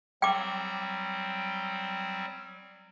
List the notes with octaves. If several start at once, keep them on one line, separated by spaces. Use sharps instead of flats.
F#3 G3 C4 G5 D6